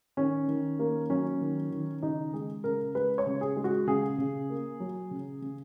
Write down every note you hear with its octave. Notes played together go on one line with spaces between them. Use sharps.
D#3 C#4
D#3
A#3
F#3 C#4
D#3
D#3
C#3 D#4
G#3 G#4
C#3 A#4
G#3 B4
C#5
C#3
G#4
G#3
F#4
C#3 G#4
C#3
A#3
F#3
C#3
C#3